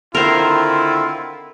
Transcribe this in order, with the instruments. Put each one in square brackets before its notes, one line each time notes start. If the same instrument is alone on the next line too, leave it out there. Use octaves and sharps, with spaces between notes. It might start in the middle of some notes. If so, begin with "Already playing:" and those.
[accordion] D3 D#3 C4 [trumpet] E4 [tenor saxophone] F4 [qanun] A#4 C5